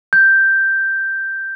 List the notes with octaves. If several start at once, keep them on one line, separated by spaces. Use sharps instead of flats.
G6